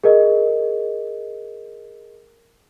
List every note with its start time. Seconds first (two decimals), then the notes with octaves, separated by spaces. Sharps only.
0.04 G#4 A#4 D#5